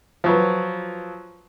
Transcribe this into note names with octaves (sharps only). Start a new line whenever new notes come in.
F3 F#3 B4